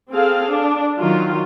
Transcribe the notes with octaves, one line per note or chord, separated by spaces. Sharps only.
C4 G#4 A4 F5
D4
D#3 F#3 F4